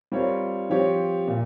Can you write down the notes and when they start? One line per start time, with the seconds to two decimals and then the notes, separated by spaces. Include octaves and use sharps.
0.12 G3 C4 F4 A#4 C#5
0.70 F3 C4 G4 C#5
1.27 A#2